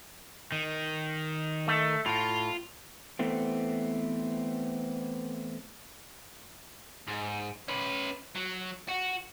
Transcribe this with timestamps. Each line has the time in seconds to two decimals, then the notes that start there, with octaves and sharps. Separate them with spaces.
0.52 D#3
1.68 A3
2.06 A2 F4 F5
3.19 E3 A3 B3 C4
7.08 G#2
7.68 C#4 B4
8.35 F#3
8.88 F#4